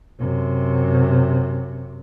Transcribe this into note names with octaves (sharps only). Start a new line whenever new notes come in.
F#2 C3